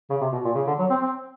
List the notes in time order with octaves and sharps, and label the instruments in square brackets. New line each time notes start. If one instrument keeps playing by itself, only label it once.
[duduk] C#3
C3
B2
A#2
C#3
D3
F#3
C4
C4